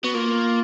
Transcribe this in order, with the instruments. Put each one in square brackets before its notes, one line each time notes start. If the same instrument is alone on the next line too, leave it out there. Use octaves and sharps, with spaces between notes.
[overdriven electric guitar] B3 [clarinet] F#4
[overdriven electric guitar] A#3 [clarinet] F4